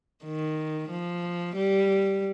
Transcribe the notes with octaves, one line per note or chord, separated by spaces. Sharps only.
D#3
F3
G3